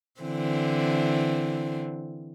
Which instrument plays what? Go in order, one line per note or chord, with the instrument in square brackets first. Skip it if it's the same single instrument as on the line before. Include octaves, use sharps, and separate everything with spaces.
[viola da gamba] D3 E3 C4